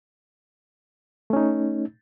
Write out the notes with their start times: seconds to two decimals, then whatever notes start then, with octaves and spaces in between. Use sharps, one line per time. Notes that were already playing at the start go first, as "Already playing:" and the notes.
1.30 A3
1.33 C#4
1.36 D#4